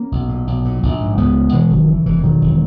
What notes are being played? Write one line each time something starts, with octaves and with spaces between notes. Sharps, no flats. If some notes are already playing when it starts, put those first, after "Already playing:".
Already playing: A#3 C#4
B1
A#2
B1
A#2
A#1
G#2
C#2 G#3 B3
C#3
B2 E3 G#3
F#1 D#3 F#3
C#3 E3
E1 E3
B2 D#3 F#3
E1